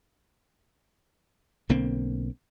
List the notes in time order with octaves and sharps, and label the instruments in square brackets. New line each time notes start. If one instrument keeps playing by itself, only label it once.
[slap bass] B1 D3 A#3 C4